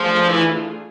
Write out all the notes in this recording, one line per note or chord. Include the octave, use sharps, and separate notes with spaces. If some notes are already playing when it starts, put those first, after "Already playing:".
Already playing: F3 A3 D4 F4 G#4
E3